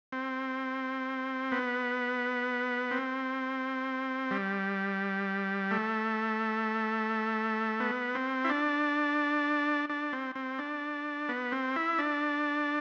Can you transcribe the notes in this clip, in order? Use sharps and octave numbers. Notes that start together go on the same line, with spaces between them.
C4
B3
C4
G3
A3
B3
C4
E4
D4
D4
C4
C4
D4
B3
C4
E4
D4